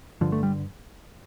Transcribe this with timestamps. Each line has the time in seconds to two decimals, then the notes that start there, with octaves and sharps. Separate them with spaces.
0.21 G2 D3 F3
0.32 A3
0.43 G3